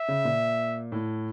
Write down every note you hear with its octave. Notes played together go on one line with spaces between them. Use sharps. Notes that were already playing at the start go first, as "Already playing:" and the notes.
Already playing: E5
C#3
A#2
A2